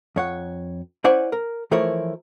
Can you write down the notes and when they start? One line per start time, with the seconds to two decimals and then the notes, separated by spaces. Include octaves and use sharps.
0.16 F2 C#5 F#5
1.04 C#4 E4 C5 D5 F#5 G#5
1.32 A#4
1.71 E3 F3 A3 E4 A#4 C#5